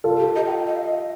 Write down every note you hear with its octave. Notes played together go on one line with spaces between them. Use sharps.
F4 A4
G4
D#5
G5
F5
D#5
F5
D#5